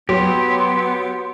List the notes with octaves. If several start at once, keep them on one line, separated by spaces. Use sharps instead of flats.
F#3 B3 G4 C6